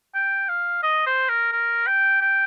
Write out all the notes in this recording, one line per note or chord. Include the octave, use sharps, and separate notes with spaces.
G5
F5
D#5
C5
A#4
A#4
G5
G5